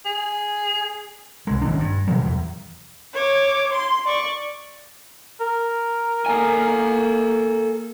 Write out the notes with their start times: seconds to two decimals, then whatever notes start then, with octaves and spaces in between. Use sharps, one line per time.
0.05 G#4
1.47 C2 G#3
1.62 A1 D#3 D4
1.79 G2
2.07 B2 E3 F3 G#3
2.24 E2
3.14 C#5 D6
3.72 C6
4.06 D5 C#6
5.41 A#4
6.26 A#3 A4 G#5